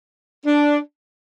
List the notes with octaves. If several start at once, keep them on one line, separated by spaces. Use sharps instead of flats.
D4